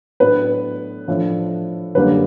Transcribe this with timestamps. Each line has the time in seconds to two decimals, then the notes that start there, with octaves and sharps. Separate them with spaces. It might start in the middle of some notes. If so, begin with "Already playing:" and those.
0.20 A2 F#3 B3 D4 B4
1.08 A2 F3 A3 D4
1.95 F#2 D3 G3 A#3 D4 B4